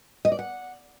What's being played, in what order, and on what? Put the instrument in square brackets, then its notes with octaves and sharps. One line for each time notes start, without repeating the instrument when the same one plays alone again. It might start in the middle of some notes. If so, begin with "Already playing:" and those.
[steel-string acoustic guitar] D#5
D5
F#5